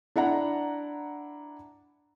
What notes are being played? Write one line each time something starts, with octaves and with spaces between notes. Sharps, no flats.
D4 E4 F#5 A#5